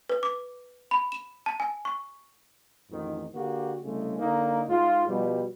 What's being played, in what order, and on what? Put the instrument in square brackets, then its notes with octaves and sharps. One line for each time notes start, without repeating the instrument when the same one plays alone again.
[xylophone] B4
D6
B5
E7
A5
G#5
C#6
[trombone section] A1 F2 G#2 D#3
D3 A#3 F#4 G4
C2 C#3 G#3 A3
D3 A#3 D#4
G#2 F4
B2 F3 G3